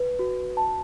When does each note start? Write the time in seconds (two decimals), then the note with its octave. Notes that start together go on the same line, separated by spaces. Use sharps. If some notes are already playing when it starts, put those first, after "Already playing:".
Already playing: B4
0.19 F#4
0.57 A5